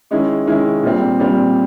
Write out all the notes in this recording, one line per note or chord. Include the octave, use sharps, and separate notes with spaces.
D#3 G#3 C#4 E4
D#3 G#3 C#4 E4
A#2 G3 C4
A#2 G3 C4